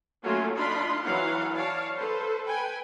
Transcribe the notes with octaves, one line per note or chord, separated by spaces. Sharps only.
F#3 A3 A#3 C#4 F4 F#4
D4 D#4 F4 B5 C6
E3 F#3 F5 F#5
C#5 D5 F5 A5
A4 B4 C5
B4 G5 G#5